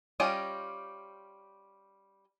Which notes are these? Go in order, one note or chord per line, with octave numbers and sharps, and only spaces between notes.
G3 C#4 F4 G4 D#5